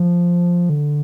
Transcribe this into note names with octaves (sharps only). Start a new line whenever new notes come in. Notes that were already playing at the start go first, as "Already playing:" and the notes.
Already playing: F3
D3